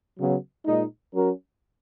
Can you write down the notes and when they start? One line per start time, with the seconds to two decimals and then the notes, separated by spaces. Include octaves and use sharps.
0.18 C#3 F#3 B3
0.65 A#2 G#3 D#4
1.14 F#3 C#4 F#4 A#4